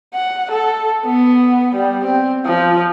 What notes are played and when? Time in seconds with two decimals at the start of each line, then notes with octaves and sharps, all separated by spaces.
0.14 F#5
0.51 A4
1.06 B3
1.75 G3
2.05 C4
2.45 F3